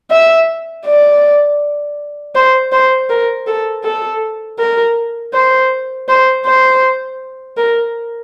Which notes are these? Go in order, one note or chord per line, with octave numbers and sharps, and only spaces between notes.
E5
D5
C5
C5
A#4
A4
A4
A#4
C5
C5
C5
A#4